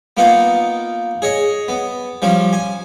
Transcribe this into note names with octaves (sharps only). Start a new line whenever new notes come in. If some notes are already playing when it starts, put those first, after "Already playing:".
A#3 B3 D#4 F4 F#5
G#4 C#5 D#5
B3
F3 G3 C#4
G#5